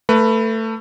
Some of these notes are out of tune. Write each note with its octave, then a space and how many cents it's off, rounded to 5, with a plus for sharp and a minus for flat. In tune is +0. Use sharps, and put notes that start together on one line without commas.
A3 +20 B4 +0